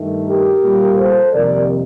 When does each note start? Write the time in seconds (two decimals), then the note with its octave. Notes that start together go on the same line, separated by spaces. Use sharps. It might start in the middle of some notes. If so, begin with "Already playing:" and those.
Already playing: G2 D#3 A3
0.25 G4 A#4
0.62 A#2 G3 A#3
0.97 A4 C5
1.33 F2 C3 D#3 G3 A#3 A#4 D5